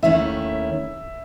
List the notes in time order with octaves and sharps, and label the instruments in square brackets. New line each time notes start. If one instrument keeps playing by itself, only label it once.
[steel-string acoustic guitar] D#2 D#3 A3 C#4 E4 [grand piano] E5